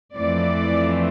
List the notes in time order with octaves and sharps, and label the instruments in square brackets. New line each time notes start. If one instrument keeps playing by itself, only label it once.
[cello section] F2 E3 A3 C4 D5